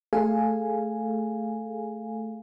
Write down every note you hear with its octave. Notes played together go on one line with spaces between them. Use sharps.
A3 G#4 A4 F5 G#5